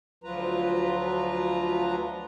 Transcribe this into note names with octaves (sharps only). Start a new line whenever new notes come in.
D2 F3 F#3 F4 B4 A#5